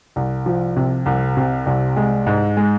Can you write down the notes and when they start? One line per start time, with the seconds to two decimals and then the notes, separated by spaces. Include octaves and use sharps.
0.16 C2
0.46 F3
0.77 C3
1.06 C2
1.37 C3
1.66 C2
1.96 G#3
2.26 G#2
2.57 G#3